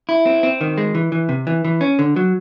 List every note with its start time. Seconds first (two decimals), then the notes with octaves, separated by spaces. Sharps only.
0.09 E4
0.26 C4
0.43 C4
0.61 D#3
0.78 G#3
0.95 E3
1.12 E3
1.29 C3
1.47 E3
1.65 E3
1.81 C#4
1.99 D3
2.16 F#3